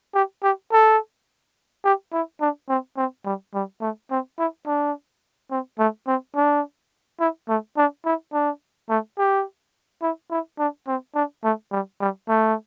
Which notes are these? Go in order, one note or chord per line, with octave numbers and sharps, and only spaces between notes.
G4
G4
A4
G4
E4
D4
C4
C4
G3
G3
A3
C4
E4
D4
C4
A3
C4
D4
E4
A3
D4
E4
D4
A3
G4
E4
E4
D4
C4
D4
A3
G3
G3
A3